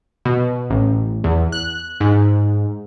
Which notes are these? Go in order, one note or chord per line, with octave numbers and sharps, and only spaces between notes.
B2
A1
E2
F#6
G#2